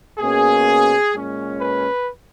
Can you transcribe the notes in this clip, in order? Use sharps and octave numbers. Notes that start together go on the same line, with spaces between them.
B2 A#3 C#4 G#4
A#2 G#3 C#4
B4